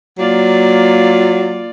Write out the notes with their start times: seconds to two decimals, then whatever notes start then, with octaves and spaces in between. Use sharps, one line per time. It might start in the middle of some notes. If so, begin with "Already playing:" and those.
0.18 F#3 A#3 F4 D5